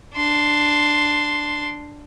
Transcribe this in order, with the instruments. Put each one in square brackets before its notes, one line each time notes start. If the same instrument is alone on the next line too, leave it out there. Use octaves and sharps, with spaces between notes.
[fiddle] D4 C6